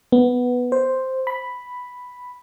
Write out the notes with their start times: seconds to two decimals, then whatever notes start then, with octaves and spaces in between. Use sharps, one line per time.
0.12 B3
0.72 C5
1.27 B5